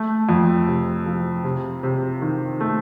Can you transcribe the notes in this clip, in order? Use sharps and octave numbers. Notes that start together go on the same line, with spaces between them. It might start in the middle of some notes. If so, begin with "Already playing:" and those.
Already playing: A3
F2
C3
F3
C3
C3
D#3
A3